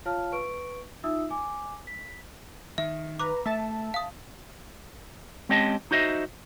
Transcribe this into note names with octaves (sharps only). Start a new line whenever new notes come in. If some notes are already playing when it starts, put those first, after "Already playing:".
F4 C#5 F5 A5 F6
B4 C#6 D7
D#4 F4 E5 D#6 E6
G#5 D6
B6
D#3 E5
B4 A#5 D6
A3 E5 A5
F5 D#6
G#3 C4 C#4 G4 D#5 A5
D#4 F#4 C5 D#5 E5